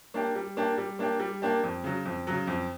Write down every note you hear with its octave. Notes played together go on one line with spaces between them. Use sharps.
A#3 D4 G4
G3
A#3 D4 G4
G3
A#3 D4 G4
G3
A#3 D4 G4
F2
C#3 F#3
F2
C#3 F#3
F2